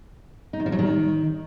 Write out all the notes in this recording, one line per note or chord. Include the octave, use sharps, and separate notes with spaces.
D#4
D#3
F3
F#3
D#3